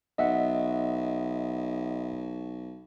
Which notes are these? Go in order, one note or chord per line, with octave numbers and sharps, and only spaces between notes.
B1 D#5 E5 F#5